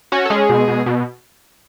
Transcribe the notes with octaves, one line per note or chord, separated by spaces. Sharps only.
C#4 F#4
A4
G#3 C#4 G#4
B2
B2
B2